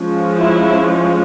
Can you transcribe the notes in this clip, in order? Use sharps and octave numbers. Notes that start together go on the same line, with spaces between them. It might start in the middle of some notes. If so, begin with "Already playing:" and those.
Already playing: F3 G#3 C#4
E4